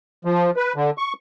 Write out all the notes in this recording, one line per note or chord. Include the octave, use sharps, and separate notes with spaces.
F3
B4
D3
C#6